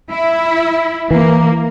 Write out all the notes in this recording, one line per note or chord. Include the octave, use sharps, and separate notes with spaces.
E4
E3 A#3